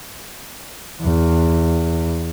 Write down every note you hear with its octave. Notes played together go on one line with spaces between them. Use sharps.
E2